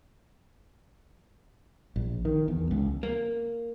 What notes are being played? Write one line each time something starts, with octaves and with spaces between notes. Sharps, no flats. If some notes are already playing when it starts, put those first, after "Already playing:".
A#1
D#3
E2
C#2
A#3